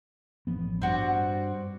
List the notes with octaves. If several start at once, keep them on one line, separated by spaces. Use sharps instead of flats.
A1 F3 B3
G2 C4 F#4 D5